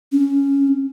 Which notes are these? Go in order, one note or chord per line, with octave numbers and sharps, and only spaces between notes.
C#4